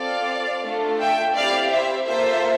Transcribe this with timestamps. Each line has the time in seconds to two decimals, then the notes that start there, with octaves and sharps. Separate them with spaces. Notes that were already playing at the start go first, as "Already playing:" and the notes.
Already playing: C4 F4 A4 D5 F5
0.63 A3 D4 F4 A4
0.99 E5 G5
1.35 C4 E4 G4 D5 F5
1.71 C5 E5
2.06 A#3 F4 A4 C5 E5